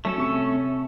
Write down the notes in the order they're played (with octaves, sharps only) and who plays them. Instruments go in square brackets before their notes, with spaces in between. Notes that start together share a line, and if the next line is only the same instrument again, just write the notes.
[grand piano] F#3 [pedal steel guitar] A3 C#4 A4
[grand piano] C3 C#6 C#7